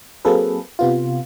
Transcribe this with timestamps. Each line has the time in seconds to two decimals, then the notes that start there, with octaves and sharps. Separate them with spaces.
0.25 F#3 A#3 C4 G#4 A4 B4
0.79 C3 B3 F4